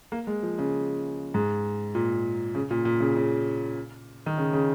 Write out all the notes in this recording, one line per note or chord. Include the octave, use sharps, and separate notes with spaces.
A#3
G#3
F3
C#3
G#2
A#2
C#3
A#2
A#2
C#3
C#3
D#3
C#3
C#3